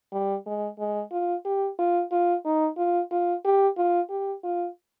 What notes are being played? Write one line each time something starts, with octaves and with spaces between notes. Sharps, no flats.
G3
G#3
G#3
F4
G4
F4
F4
D#4
F4
F4
G4
F4
G4
F4